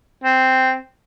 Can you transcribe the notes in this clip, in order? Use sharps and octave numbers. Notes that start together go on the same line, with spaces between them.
C4